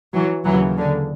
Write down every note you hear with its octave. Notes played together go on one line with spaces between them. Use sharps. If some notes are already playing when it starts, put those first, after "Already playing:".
E3 F#3
D#2 C#3 E3 F#3
D3